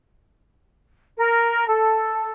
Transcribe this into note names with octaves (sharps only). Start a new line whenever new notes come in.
A#4
A4